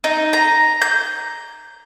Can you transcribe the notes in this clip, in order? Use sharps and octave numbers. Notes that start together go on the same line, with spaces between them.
D#4
A#5
G6